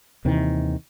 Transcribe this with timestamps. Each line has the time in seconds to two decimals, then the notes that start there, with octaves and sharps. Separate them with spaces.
0.25 D#2 C3 D#3 E3